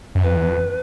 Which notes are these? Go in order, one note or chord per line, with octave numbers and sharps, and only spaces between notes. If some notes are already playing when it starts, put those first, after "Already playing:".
F#2
F2 B4
E2
F2